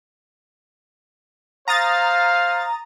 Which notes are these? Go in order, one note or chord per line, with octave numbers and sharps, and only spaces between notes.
C5 F5 A#5 D#6 A6